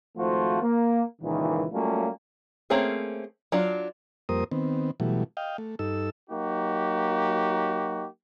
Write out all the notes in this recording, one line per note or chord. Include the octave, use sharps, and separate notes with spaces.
G#1 F3 A3 F4 F#4 C5
A#3
C#2 A#2 D#3 E3
F#3 G3 A3 A#3 C#4 F4
A3 A#3 C4 C#4 G#4
F#3 D4 F4
F2 G3 A#3 A#4 C5 D#6
D#3 B3 C4
B2 E3 F#3 G3 A3
D#5 F5 G5
A3
G2 D#4 A4 E6
F#3 A#3 D#4 F#4 G4